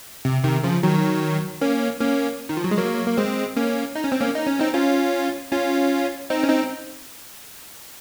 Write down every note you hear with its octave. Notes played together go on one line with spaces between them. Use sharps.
C3
C3 D#3
C#3 F3
D#3 F#3
A#3 C#4
A#3 C#4
D#3
F3
F#3
G#3
F#3 A#3
A#3
G#3 C4
A#3 C#4
D#4
C#4
C4
A#3 C#4
D#4
C#4
C4 D#4
C#4 F4
C#4 F4
C4 D#4
C#4
C4 D#4